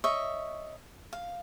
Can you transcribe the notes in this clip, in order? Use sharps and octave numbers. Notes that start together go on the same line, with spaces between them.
C#5 D#5 E5 C#6
F5